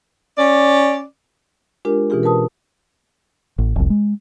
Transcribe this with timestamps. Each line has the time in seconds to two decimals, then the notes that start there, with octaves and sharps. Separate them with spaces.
0.37 C#4 D5
1.85 G#3 D4 F4 G4 A#4
2.10 B2 E3 C#4 F4 G4 G#4
2.23 A#4 B4 A5 D#6
3.58 A1
3.76 F1 C2
3.90 G#3